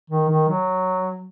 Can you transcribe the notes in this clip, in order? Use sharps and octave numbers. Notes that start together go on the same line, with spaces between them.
D#3
D#3
F#3